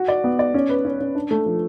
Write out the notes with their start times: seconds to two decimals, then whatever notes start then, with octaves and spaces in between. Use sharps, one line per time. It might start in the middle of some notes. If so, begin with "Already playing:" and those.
Already playing: F#4
0.08 D5
0.24 B3
0.39 D5
0.54 C#4
0.69 B4
0.85 C#4
1.00 C#4
1.15 D4
1.31 A3
1.46 F3